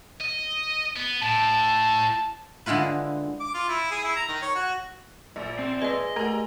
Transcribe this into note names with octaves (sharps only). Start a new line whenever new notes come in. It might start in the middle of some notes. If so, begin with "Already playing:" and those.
D#5
B3
A2 A5
D3 G#3 E4 F4 B4
D6
F4
E4
G#4
E4
A#5
D#3
C#5
F#4
A#1 D5 E6
C4 E6
G#3 B4 D5 D#5 E6
A3 G4 A#4